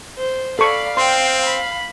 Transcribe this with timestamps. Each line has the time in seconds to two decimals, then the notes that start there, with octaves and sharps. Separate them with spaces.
0.17 C5
0.59 A4 D5 F5 B5 C#6
0.97 C4 G5 C6
1.46 B5